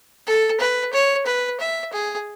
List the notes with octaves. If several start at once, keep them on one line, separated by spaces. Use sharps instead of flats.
A4
B4
C#5
B4
E5
G#4